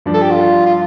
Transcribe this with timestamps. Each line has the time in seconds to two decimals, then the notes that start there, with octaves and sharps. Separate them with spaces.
0.06 G2 F3 D4
0.14 A4
0.22 G4
0.31 F4
0.66 F4